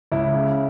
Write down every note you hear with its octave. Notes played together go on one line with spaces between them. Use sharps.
C#2 E4
C#3